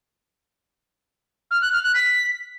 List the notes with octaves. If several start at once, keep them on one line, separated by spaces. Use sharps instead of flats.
F6
F#6
F6
F#6
B6